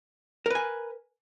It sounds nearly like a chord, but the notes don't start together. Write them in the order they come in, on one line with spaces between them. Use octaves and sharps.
A#4 B4 G#5